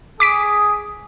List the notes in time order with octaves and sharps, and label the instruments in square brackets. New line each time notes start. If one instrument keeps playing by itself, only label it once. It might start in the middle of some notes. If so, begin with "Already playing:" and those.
[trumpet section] G#4 D#6 [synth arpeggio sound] D6 B6 D7